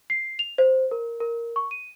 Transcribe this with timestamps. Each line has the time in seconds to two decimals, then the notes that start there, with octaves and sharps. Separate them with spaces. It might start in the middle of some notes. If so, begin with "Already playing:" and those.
0.10 C7
0.39 F7
0.58 C5
0.91 A#4
1.20 A#4
1.56 C#6
1.71 D#7